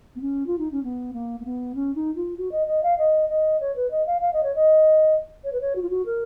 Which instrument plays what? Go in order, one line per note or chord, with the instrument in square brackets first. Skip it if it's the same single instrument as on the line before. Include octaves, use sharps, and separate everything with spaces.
[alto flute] B3
C#4
F4
D#4
C#4
B3
A#3
A#3
B3
C#4
D#4
F4
F#4
D#5
D#5
F5
D#5
D#5
C#5
B4
D#5
F5
F5
D#5
C#5
D#5
C#5
B4
C#5
F#4
F4
F#4
A#4